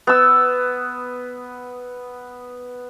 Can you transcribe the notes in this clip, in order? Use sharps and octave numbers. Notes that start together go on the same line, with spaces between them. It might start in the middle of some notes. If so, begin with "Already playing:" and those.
B3 E6